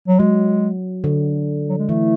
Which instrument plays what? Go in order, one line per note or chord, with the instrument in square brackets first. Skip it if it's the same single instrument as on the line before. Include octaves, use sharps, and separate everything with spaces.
[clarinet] F#3
[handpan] F#3 [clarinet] G#3
[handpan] D3
[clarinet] F#3
G#3
[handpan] E3 [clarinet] A3